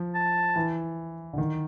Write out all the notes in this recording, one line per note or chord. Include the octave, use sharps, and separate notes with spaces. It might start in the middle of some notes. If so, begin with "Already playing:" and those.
Already playing: F3
A5
E3
D3
D#3